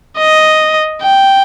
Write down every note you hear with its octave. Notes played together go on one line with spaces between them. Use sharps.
D#5
G5